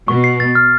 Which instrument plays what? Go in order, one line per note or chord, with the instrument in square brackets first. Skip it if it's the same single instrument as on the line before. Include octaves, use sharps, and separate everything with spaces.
[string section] B2 [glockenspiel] C#6
[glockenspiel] C7
A6
F6